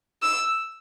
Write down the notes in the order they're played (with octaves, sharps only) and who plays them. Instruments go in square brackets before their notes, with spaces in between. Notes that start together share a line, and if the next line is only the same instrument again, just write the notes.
[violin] E6